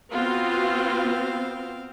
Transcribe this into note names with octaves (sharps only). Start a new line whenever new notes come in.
B3 C4 F4 F#4 F5